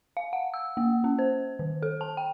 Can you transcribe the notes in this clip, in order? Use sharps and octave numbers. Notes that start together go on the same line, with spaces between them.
F5
F#5
E6
A#3
C#4
C5
D#3
A4
A5
G5